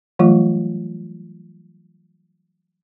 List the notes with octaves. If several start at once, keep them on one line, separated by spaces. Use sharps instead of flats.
E3 F#3 G3 A3 F4